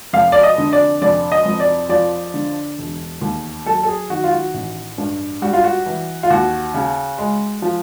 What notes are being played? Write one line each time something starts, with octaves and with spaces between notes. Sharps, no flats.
F1 F5
D5
D#5
D3
D5
F1 D5
D#5
F2
D5
F3 D5
D3
E1
D#2
F#3 A4
A4
G#4
D#3 F#4
F4
F#4
A1
G2
G3 F#4
F4
F#4
E3
F4
D#2 F#4
C#3
G#3
F3